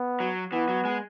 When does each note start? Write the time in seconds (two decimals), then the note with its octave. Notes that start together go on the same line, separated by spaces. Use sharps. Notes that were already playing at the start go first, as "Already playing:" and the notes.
Already playing: B3
0.20 F#3
0.52 E3 B3
0.68 F#3
0.85 G#3